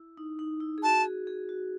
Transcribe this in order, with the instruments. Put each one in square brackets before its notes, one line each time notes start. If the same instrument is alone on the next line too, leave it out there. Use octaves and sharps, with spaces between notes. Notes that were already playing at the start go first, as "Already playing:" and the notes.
Already playing: [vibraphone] E4
D#4
D#4
E4
G#4
[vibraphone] F#4 [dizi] A5
[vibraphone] G#4
G#4
F#4